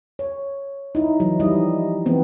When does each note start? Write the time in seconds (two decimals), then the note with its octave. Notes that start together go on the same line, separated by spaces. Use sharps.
0.19 C#5
0.95 D#4 E4
1.20 E3 F#3
1.40 F3 G3 D#4 E4 D#5
2.06 E3 B3 C4